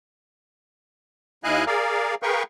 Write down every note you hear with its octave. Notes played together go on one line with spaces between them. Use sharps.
D#2 E4 D#5 F5 G#5 F#6
G#4 A#4 D5 F5
G#4 A#4 B4 F5 G5 C#6